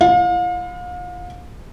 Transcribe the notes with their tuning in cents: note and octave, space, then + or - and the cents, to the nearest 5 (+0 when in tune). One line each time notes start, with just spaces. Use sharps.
E4 +35 F5 +40